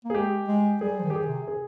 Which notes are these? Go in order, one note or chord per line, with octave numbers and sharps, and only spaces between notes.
A#3
G#4
G#3 G4
G#3
G3 G#4
F3
D#3
G4
G#4
C3
G#4